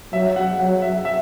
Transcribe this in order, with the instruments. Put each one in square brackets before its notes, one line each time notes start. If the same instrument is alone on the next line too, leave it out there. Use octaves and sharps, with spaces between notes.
[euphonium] F#3 [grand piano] E5
[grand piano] F#5
[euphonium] F#3 [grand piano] F#5
[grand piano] E5
E5